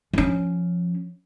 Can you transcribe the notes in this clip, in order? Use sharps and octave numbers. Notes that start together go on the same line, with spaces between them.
F3 C#4